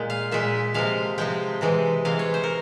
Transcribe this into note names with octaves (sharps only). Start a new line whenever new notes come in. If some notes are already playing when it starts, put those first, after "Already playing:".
Already playing: A#2 G#3
F5
A#2 G#3 E5
C3 F3 G#3 F5
C3 F3 G#3 G5
C3 E3 G#3
C3 E3 G#3 F5
C#5
C5
A#4